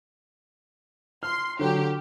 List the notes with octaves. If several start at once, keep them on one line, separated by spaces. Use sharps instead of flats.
C6 F6
D3 F#3 G4